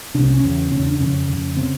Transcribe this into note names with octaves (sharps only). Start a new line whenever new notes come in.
C2 C3 D4
C#4
C#4
E2 C#3
E2 C#3 C#4
D4
F2 C#3 C#4
F2 C#3
C#3 C4